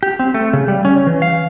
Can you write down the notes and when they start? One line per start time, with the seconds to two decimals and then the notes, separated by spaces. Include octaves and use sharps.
0.03 G4
0.19 C4
0.34 A3
0.53 C#3
0.68 G3
0.85 C#4
1.07 E3
1.22 F5